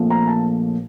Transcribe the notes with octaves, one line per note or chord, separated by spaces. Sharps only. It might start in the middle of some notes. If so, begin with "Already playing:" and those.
Already playing: A#1 A#2 F3 A3 C4
A#5
A5